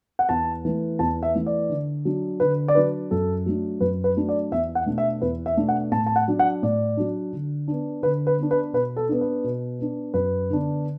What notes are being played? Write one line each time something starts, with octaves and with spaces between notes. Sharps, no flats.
F#5
E2 A5
E3 A3
E2 A5
E5
E3 A3
D5
D3
F#3 D4
D3 B4
D5
F#3 D4 B4
F#2 A4
F#3 A3 D4
F#2 B4
B4
F#3 A3 D4
D5
E2 E5
F#5
B2 A3 D4
E5
E2 B4
E5
B2 A3 D4
F#5
A2 A5
A5
F#5
F#3 D4
F#5
A2 D5
F#3 D4
D3
B3 D4
D3 B4
B4
B3 D4
B4
B2 B4
A4
B3 D4
B4
B2
B3 D4
F#2 B4
D3 B3 D4